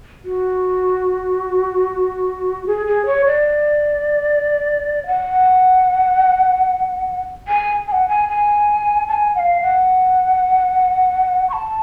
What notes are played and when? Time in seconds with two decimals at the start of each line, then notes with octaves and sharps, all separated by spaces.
0.25 F#4
2.67 G#4
2.87 G#4
3.06 C#5
3.26 D5
5.07 F#5
7.48 G#5
7.87 G#5
7.92 F#5
8.09 G#5
8.29 G#5
9.08 A5
9.13 G#5
9.35 F#5
9.39 F5
9.62 F#5
11.50 C#6
11.53 A5